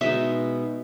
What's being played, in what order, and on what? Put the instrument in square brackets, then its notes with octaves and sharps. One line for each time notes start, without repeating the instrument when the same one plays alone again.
[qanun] B2 G#3 D#4 E5